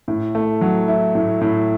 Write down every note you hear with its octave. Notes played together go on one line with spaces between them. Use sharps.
A2
A3
F#3
E4
A2
A2